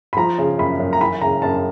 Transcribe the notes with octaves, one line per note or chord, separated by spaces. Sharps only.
B5
F3 A#5
C#3
F#2 B5
F#2
A#5
E3 B5
C#3 A#5
F#2 A5